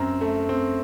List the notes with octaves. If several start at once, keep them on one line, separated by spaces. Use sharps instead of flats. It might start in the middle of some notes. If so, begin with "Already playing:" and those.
Already playing: F#2 C4 A#5
A3
C4